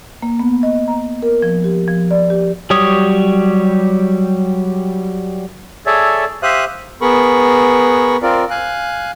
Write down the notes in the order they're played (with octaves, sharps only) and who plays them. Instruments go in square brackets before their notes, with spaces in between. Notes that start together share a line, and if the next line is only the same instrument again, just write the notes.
[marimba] A#3
B3
D#5
A#5
A#4
F3
G4
F3
D5
G4
[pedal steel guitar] F#3 G3 G4 C#5 D#6
[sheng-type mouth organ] G#4 A4 C#5 D5 E5
G4 C5 E5 F5 D#6 F#6
B3 G#4 A#4 B5 C#6
C4 F4 A#4 D5
F5 G#5 F#6